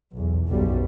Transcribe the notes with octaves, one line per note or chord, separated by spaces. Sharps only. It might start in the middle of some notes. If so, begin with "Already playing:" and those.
B1 E2
F#1 B1 F#2 G3